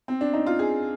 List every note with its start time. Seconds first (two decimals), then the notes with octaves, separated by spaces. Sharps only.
0.08 C4
0.21 D4
0.33 D#4
0.46 F4
0.59 G#4